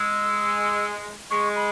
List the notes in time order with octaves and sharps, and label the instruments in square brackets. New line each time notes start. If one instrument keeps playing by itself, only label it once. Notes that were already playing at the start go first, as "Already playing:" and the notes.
Already playing: [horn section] G#3 [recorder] E6
[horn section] G#3 [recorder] C#6
[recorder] B5